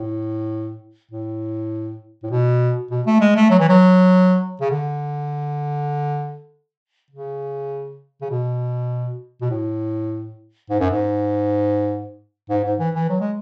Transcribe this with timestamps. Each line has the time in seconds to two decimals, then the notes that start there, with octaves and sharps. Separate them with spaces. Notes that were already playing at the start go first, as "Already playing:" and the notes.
Already playing: A2
1.11 A2
2.23 A2
2.31 B2
2.91 B2
3.06 A3
3.21 G#3
3.36 A3
3.50 F#3
3.59 E3
3.69 F#3
4.61 C#3
4.70 D3
7.10 C#3
8.21 C#3
8.30 B2
9.41 B2
9.50 A2
10.70 G#2
10.80 F#2
10.91 G#2
12.50 G#2
12.64 G#2
12.79 E3
12.95 E3
13.09 F#3
13.20 G#3